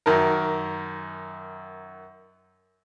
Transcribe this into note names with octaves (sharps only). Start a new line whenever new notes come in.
F#2 D#3 A#4